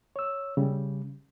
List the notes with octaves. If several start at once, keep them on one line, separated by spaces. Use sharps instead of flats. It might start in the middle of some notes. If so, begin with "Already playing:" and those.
C#5 E6
C#3 G3